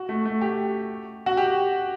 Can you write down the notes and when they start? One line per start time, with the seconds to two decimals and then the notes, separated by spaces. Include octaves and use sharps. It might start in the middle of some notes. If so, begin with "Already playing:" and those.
Already playing: F#4
0.09 A3
0.25 A3
0.41 G4
1.26 F#4
1.37 G4